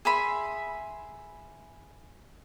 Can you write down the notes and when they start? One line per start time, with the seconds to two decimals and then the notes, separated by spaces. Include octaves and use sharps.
0.05 G#4 E5 B5 C6